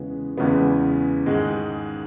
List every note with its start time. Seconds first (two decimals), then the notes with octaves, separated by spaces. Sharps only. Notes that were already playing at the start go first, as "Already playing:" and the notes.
Already playing: E2 C#3 E3 G#3 B3
0.38 E2 C#3 E3 G#3 B3
1.26 G#2 D#3 G#3